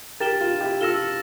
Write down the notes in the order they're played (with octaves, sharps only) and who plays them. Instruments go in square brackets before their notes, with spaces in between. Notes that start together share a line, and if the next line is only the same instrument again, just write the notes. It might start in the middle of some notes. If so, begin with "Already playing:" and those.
[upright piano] G4 A#4 [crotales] A6 E7 G7
[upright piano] F4
E4 G4
[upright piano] F4 A4 [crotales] E6 A#6 E7 G7